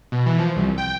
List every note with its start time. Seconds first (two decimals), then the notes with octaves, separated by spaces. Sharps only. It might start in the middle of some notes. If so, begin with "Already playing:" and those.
0.12 B2
0.26 E3
0.38 F3
0.56 C2
0.78 G5